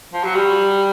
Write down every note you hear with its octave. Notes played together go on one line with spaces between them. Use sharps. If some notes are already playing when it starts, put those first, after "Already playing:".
F3
F#3
G3